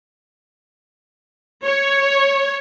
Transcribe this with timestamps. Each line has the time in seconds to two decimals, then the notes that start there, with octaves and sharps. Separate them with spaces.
1.65 C#5